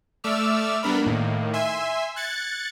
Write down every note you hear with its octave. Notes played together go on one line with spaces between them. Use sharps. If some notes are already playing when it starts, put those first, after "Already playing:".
A3 D5 E5 D6 E6 F6
G3 B3 D4 A#4 B5
A2 D#3 A#3
E5 G#5 C6 E6
F#6 G#6 A6 C#7